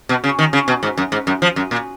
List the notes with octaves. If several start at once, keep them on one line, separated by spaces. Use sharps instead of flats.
B2
C#3
D#3
C#3
B2
G#2
F#2
G#2
F#2
F3
F#2
A#2